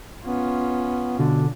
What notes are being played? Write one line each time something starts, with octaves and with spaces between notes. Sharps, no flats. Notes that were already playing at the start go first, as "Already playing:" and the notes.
B3 C#4 F4
B2 D3 D4